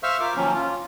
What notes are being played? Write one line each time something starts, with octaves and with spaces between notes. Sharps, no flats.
C5 E5 F5 C#6 E6 F6
F4 A#4 D6
D#3 F3 F#3 A#3 C#4
F4